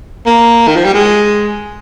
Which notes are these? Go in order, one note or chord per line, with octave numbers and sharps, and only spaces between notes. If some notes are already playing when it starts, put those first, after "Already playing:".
A#3
D#3
F3
G3
G#3